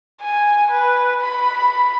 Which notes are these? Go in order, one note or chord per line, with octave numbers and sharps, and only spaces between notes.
G#5
B4
B5